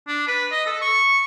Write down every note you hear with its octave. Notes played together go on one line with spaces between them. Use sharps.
D4
B4
D#5
A4
C#6